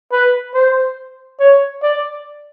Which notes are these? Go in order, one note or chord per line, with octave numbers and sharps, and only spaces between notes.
B4
C5
C#5
D5